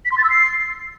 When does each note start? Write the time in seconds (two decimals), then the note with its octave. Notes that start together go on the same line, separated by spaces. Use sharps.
0.05 B6
0.11 C6
0.18 A6
0.24 E6
0.30 C7